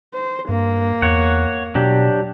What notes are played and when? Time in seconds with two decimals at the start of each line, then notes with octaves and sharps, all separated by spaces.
0.14 C5
0.49 G2 A#3
1.02 E2 C#5 F#5
1.75 B2 F#3 D4 G4